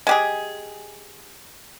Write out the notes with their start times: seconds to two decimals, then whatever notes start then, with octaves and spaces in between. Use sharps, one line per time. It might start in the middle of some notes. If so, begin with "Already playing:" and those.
0.07 G#3 G4 G#4